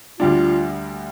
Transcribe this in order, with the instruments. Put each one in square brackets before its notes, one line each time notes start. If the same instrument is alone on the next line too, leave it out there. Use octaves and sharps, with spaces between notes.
[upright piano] D2 D3 G3 D4 [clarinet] F4